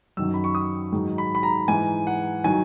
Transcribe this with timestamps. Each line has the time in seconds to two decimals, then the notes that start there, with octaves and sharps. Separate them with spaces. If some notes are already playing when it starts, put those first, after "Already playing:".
0.17 F#2 D#3 F#3 E6
0.34 B5
0.44 C#6
0.55 D#6
0.92 G#2 D#3 F#3
1.18 B5
1.35 B5
1.43 A#5
1.68 G#2 E3 G#5
2.07 F#5
2.44 D#3 F#3 G#5